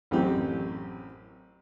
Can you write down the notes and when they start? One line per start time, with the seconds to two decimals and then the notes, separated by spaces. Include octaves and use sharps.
0.11 A1 F#2 C4 G4